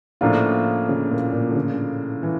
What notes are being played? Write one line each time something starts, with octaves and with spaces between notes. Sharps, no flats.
A2 C#3 F3 A#3 D4 F4
C#3
A#2
A#2
D3
C#3
E3